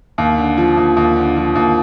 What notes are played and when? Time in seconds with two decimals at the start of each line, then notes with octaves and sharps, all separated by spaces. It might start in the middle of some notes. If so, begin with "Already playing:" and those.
0.18 D#2
0.38 D3
0.57 F3
0.77 D#2
0.97 D#2
1.17 D3
1.36 F3
1.55 D#2